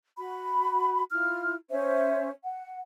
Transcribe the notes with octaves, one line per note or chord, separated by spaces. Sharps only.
F#4 B5
E4 F4 F6
C#4 C5 E5
F#5